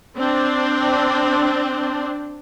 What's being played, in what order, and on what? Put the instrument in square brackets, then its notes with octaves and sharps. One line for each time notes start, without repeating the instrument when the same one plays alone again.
[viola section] C4 D4